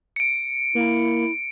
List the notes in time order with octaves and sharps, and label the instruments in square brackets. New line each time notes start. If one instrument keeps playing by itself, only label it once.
[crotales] C#7 D7
[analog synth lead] A#3 [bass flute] E4